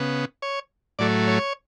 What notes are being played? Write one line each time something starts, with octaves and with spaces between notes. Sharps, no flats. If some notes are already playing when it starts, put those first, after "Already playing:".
Already playing: C#3 B3
C#5
A2 F#3 A3 D5
C#5